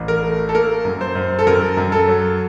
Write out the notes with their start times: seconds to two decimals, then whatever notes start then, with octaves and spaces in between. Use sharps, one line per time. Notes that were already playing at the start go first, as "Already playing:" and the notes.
Already playing: A1
0.08 A#4
0.23 A3
0.49 A4
0.54 A#3 A#4
0.85 F#2
1.01 C5
1.15 F#2
1.39 A4
1.47 F#2 A#4
1.77 F#2
1.92 A4
2.08 F#3